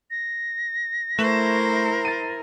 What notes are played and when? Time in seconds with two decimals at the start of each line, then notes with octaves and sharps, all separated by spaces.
0.11 A#6
1.19 A3 E4 A#4 C5 C#6 E7
2.05 A6 D#7